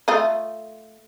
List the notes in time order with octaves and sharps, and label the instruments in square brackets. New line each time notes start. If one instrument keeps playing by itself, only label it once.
[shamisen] A3 F4 D#5